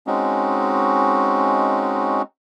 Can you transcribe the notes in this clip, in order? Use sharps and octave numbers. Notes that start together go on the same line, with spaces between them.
G#3 C4 C#4 D#4 F#4